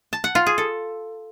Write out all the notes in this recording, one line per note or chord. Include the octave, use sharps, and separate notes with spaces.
A5
F#5
F4
G#4
A4